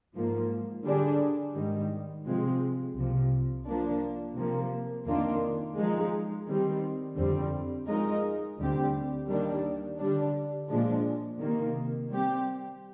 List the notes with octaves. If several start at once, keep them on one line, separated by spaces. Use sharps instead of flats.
G#2 F3 A#3
D3 G3 D4 G#4
G#2 D#3 G3
C3 F3 G#3 C4
C2 C3 F3
F3 A#3 D4
C3 F3 A#3
F2 D#3 A#3 D4 F4
F3 G#3 D#4
D#3 G3 C4
F2 D3 G3 C4
F3 G#3 D#4 A#4 D#5
D2 D3 G3 C4 G4
D#3 G3 A#3 D4
D3 G3 D4
A#2 F3 G#3 D4
C3 D#3 A#3
G3 C4 G4